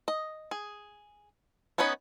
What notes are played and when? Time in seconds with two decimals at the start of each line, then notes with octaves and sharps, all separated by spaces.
0.08 D#5
0.51 G#4
1.78 B3 C#4 D#4 B4 C#5